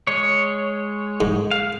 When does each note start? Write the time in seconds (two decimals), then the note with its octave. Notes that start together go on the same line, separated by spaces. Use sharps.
0.07 G#3 C#5
1.21 G#2
1.51 F5